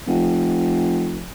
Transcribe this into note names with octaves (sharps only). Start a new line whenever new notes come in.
F1